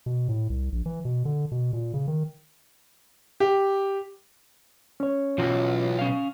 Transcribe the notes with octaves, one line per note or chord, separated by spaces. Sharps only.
B2
A2
C2
A#1
E3
B2
D3
B2
A#2
C#3
D#3
G4
C#4 C#5
B1 E3 F4 F#4
C#4 F5